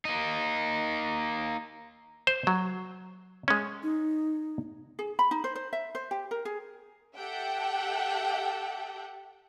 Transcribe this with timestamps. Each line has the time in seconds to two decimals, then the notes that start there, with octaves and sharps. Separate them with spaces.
0.05 A#3 D#4
2.27 C5
2.47 F#3
3.48 G#3 C#4
3.83 D#4
4.99 G#4
5.19 B5
5.31 D#4
5.44 C5
5.55 C5
5.73 E5
5.95 C5
6.11 G4
6.31 A#4
6.45 G#4
7.18 G4 A4 E5 F#5 G5